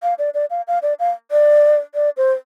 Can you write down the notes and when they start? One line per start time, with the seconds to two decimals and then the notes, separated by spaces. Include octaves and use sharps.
0.03 F5
0.19 D5
0.34 D5
0.50 F5
0.68 F5
0.82 D5
1.00 F5
1.31 D5
1.95 D5
2.17 C5